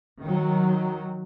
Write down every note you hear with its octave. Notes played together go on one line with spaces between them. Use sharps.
D#3 F#3